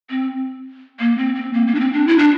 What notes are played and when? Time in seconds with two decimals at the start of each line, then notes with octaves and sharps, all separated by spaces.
0.10 C4
1.00 A#3
1.18 C4
1.35 C4
1.53 A#3
1.67 A#3
1.75 D4
1.80 C4
1.93 D4
2.07 E4
2.18 D4